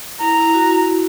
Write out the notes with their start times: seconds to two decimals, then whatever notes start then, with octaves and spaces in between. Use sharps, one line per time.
0.20 E4 A#5
0.38 E4
0.54 F#4
0.71 F#4